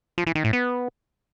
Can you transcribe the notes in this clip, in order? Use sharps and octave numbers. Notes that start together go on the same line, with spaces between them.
F3
E3
D#3
A2
B3